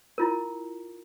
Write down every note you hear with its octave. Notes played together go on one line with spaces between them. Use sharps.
E4 F4 A#4